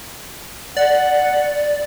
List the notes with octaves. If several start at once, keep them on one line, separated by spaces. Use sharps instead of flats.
D5 F#5